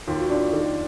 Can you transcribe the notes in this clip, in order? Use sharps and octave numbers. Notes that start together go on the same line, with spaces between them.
D#2 F4
F#4
D4 F4
D#3